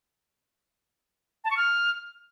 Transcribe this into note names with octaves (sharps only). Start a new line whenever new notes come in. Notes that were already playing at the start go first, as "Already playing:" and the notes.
A5
C#6
F6